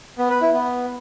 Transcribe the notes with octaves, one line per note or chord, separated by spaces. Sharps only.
B3
B4
E4
B3